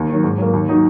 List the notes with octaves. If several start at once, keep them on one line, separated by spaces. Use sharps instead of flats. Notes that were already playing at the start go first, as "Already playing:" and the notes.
Already playing: D#2
D#3 F#3
G#2
F#3 A#3
D#2
D#3 F#3 D#4 F#4